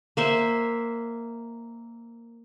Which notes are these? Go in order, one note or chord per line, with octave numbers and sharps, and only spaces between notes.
A#3 C5 E5